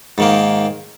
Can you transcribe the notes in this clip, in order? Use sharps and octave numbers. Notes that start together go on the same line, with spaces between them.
G#2 D#3 A#3